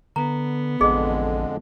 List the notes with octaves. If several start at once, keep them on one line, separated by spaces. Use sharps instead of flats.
D3 B3 A#5
A1 F2 D3 G#3 G#4 D#5